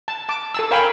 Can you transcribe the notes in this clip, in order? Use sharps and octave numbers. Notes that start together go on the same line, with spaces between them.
A5
A5 D6
A4 A5 E6
A#4 C#5 F5 G5 G#5 B5